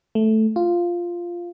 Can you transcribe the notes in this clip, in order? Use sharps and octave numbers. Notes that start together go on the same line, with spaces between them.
A3
F4